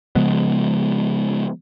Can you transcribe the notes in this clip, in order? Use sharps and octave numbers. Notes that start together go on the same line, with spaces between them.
C#3 F3 G#3 B3